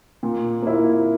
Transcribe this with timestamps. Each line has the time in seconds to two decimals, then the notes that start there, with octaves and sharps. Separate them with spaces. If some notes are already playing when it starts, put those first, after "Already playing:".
0.23 A#2
0.63 A#3 E4